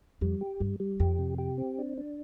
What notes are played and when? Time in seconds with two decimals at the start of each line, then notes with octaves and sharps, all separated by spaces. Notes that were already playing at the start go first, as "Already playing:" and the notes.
0.21 F2 G3
0.41 G4
0.60 G2 G3
0.80 G3
1.00 F2 G4
1.19 C3
1.38 G4
1.58 C4
1.78 D4
1.97 D4